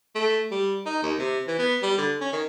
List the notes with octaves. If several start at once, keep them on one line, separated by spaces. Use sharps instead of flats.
A3
G3
D#4
D#2
C3
E3
B3
G3
D3
C#4
D#3